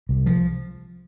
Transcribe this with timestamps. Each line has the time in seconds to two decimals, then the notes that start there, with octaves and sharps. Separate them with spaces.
0.09 C2
0.26 F3